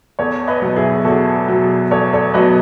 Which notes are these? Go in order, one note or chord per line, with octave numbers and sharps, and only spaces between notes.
E2 A4 C#5
B4 D#5
B2 F#3
E4 G#4
E2 F#4 A4
B2 F#3
E2 A4 C#5
A4 C#5
B2 F#3 B4 D#5